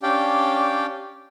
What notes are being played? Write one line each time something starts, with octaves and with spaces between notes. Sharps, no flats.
C#4 D4 G4 D5 F5 G5